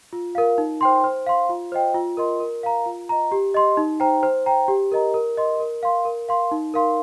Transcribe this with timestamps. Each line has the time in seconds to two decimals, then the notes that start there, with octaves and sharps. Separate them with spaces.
0.13 F4
0.35 A#4 F5
0.58 D#4
0.81 C5 G5 C6
1.04 C5
1.26 F5 C6
1.49 F4
1.72 C5 D#5 G5
1.94 F4
2.17 A#4 D#5 C6
2.40 A#4
2.63 F5 A#5
2.86 F4
3.09 D#5 A#5
3.32 G4
3.54 D#5 C6
3.77 D#4
4.00 C5 G5 A#5
4.23 C5
4.46 G5 A#5
4.68 G4
4.92 A#4 D#5 A#5
5.14 A#4
5.37 D#5 C6
5.60 A#4
5.83 F5 C6
6.05 A#4
6.29 F5 C6
6.51 D#4
6.74 A#4 F5 C6